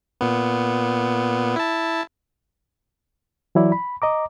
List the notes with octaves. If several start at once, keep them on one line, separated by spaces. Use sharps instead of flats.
A#2 B3
E4 A5
E3 F#3 E4 D5
B5
D#5 A#5 D6